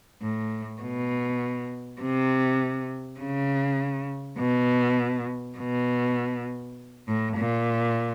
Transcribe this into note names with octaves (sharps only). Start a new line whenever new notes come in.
A2
B2
C3
C#3
B2
B2
A2
A#2